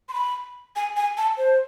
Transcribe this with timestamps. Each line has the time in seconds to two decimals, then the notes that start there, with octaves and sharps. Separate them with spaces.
0.09 C6
0.13 B5
0.76 G#5
0.97 G#5
1.17 A5
1.38 C5